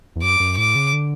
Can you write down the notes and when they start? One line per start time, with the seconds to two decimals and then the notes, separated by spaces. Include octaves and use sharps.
0.16 E2
0.23 F#2 D6
0.40 F#2
0.57 A2 D6
0.75 C#3
0.93 D3